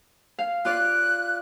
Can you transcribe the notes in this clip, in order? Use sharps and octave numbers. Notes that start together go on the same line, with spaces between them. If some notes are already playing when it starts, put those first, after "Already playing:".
F5
F4 D5 F5 F#6